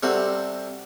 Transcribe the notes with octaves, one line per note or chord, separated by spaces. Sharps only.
C3 G3 C4 F#4 A4